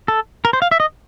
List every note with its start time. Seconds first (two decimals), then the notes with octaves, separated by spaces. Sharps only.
0.08 A4
0.45 A#4
0.53 C5
0.62 F5
0.71 E5
0.80 D#5